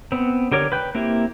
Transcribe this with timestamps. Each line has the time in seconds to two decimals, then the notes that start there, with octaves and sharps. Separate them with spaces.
0.12 B3 C4
0.52 D3 G4 A#4 C#5 D6
0.72 B4 G5
0.95 A#3 C4 E4 G4